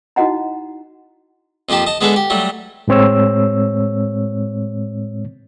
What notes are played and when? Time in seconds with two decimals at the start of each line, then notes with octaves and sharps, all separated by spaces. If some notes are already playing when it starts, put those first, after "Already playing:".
0.16 D#4 E4 F#4 D#5 F#5 A#5
1.69 F2 F3 A#3 G4 A5
1.86 D#5 A5
2.01 G#3 B3 D4 G#4 A4 B4
2.16 G4
2.30 F#3 G3 A3
2.88 A2 G#3 C4 C#5 E6